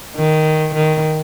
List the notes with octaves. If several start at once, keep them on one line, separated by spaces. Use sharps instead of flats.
D#3
D#3